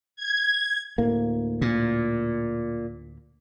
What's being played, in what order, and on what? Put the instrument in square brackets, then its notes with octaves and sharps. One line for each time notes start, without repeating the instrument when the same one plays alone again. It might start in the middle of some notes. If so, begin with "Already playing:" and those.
[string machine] G#6
[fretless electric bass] D2 A2 A#3
[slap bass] A#2